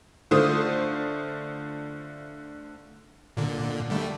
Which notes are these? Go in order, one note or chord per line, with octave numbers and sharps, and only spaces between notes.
D3 A3 F4 C5 D#6
A#2 D3
D3 G3 A3